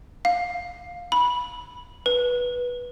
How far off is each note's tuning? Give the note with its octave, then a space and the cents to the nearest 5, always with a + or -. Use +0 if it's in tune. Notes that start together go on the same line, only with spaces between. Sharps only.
F5 +15
B5 -15
B4 -10